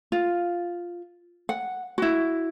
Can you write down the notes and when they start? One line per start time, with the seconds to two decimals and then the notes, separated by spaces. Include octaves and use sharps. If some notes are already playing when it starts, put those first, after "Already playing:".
0.12 F4
1.49 F#5
1.98 E4 F#4